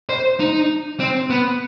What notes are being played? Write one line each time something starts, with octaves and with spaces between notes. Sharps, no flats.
C5
D#4
C4
B3